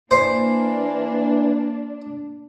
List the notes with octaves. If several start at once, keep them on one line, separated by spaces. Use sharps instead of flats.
E3 A#3 D4 C5